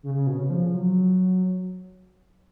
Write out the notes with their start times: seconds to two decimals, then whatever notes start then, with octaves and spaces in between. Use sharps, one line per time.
0.03 C#3
0.15 C#3
0.27 B2
0.38 C#3
0.50 F3
0.74 F#3